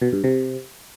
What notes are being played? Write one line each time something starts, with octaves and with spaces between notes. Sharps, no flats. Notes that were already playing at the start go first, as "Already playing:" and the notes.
B2
G2
C3